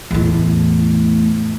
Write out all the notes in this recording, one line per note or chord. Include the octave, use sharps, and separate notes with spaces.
E2 A2